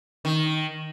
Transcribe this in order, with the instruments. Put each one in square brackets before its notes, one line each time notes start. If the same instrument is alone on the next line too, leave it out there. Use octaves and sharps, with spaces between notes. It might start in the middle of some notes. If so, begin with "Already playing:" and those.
[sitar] D#3